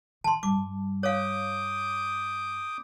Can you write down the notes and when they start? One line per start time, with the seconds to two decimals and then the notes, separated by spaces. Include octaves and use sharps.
0.24 D#3 A5 C6
0.43 G2 G3 D6
1.03 C#5 F5 D6 D#6 G6